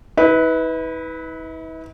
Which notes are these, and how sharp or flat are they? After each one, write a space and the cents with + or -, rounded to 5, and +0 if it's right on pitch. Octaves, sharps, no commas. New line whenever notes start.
E4 -45 B4 +0